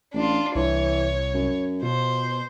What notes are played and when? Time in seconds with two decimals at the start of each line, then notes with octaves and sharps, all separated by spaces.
0.14 A1 D4 F4
0.55 C2 E3 C#5
1.34 F#2
1.82 B2 F3 C5